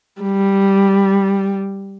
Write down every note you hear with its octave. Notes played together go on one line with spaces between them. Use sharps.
G3